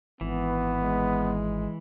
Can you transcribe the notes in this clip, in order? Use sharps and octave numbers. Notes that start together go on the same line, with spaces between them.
G#1 E3 B3
G#3